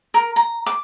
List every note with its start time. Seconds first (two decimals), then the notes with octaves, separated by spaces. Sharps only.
0.14 A#4
0.36 A#5
0.66 D6